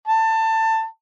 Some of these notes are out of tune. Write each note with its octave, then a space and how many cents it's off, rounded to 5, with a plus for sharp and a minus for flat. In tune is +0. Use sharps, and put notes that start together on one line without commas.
A5 +20